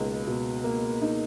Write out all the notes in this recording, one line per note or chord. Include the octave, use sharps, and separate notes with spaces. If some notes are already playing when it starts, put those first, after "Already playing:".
Already playing: C#2 B2 A#3 D#4
B2
A#3
D#4